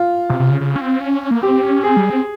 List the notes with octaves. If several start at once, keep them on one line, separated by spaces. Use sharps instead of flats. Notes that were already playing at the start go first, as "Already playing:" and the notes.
Already playing: F4
C3
C3
C#3
C#3
C#4
C4
C#4
A#3
C4 G4
C#4
C4 G#4
G3
C4